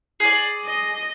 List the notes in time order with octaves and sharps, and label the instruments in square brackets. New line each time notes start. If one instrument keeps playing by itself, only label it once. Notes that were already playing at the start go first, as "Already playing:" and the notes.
[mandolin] G#4 D5
[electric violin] D#5